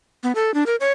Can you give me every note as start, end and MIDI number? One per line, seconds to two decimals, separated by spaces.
0.23 0.32 59
0.35 0.54 69
0.54 0.64 62
0.66 0.76 70
0.80 0.92 73